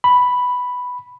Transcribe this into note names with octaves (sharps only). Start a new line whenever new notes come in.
B5